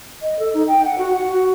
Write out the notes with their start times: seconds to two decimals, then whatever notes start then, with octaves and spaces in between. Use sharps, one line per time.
0.22 D#5
0.39 A4
0.54 D#4
0.68 G5
0.85 F#5
0.98 F#4
1.13 F#5
1.27 F#4